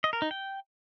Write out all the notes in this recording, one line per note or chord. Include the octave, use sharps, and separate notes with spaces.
D#5
A#4
D#4
G5